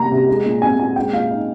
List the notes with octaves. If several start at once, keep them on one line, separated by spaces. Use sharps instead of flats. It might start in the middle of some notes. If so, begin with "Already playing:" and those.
Already playing: C3 G3 A#3 A#5
C3
G#3
A#2
C4 G#5
A#2 G#5
G#3 G5
A#2 F5
D#4